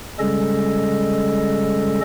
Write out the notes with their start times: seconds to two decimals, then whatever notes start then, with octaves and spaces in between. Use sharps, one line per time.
0.19 C#3 G3 G#3 C#4 A4 D#5